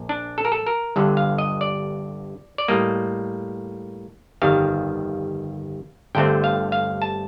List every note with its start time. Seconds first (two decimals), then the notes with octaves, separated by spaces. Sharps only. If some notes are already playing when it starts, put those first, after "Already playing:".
Already playing: A#1
0.09 D4
0.38 A4
0.45 A#4
0.52 A4
0.66 A#4
0.96 G1 G2 D3
1.17 F5
1.38 D#5
1.61 D5
2.58 D5
2.68 A2 G3 A#3 D#5
4.42 G1 F2 D#3 G3 F5
6.15 G1 G2 D3 A3 C4 G5
6.44 F5
6.72 F5
7.02 A5